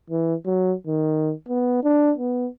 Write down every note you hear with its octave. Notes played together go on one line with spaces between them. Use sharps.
E3
F#3
D#3
B3
D4
B3